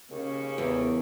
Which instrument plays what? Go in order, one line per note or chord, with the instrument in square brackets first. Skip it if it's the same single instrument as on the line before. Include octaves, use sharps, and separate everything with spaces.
[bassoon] D#2 [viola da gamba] C#3 C#4
[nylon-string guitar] E2